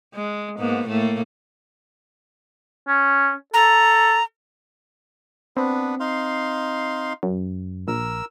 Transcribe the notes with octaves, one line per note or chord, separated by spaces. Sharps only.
G#3
G#2 A#3 B3
A2 A3 A#3
C#4
A4 A#5
B3 C4 D4 B4
D#4 F5 C6
F#2
A#1 A#4 E6